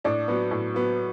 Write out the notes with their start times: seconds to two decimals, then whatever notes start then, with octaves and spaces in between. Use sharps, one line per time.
0.04 A2 D4
0.28 F#3 B3
0.51 A2
0.74 F#3 B3